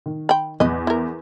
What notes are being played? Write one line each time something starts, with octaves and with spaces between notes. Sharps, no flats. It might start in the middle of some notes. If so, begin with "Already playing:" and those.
D#3
G5 B5
E2 B4 D#5
E4 A#4